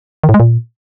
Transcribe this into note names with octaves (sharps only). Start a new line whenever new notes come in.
D#3
A2
G#3
A#2